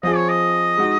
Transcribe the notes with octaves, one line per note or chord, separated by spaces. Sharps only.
F3 C4 F4 G#4 D#5
C#5
D#5
G#3 D#4 F#4